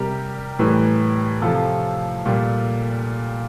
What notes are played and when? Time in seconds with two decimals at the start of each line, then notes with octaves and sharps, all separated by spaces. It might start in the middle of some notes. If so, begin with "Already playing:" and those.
Already playing: C3 G3 G4 A#4
0.59 A2 E3 G3
1.42 C3 F3 F4 A4
2.26 A#2 G3